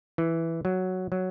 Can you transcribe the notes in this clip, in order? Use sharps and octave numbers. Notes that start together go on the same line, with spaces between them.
E3
F#3
F#3